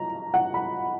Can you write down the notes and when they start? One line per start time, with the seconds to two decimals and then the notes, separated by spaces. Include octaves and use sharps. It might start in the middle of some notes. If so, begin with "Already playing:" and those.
Already playing: A#5
0.34 F#5
0.54 B5